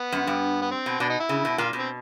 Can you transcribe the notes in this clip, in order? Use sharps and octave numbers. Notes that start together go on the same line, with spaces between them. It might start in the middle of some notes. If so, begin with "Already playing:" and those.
Already playing: B3
F#2
G2
B3
C4
B2
B2 D4
D#4
E4
C#3
B2
A#2 F4
B2
C4